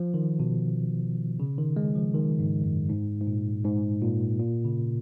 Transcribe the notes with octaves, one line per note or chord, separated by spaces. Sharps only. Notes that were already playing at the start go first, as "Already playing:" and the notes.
Already playing: F3
D#3
B2
C#3
D#3
G#3
F3
D#3
G#2
F#2
G#2
G#2
A#2
G#2
A#2
A#2
C#3